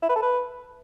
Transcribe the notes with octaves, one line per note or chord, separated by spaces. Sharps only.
E4
B4
A4
B4